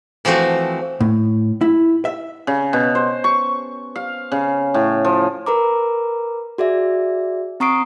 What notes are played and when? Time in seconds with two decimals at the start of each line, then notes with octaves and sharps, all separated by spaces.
0.25 E3 F3 A3 C4 F#4
1.00 A2
1.61 E4
2.05 E5
2.47 C#3
2.73 B2
2.95 C5
3.24 C#6
3.96 F5
4.32 C#3
4.74 A2
5.05 F3
5.46 A#4 B4 A#5 D6
6.58 F#4 G#4 D5 E5
7.60 C4 A#5 C#6 D#6 C7 D7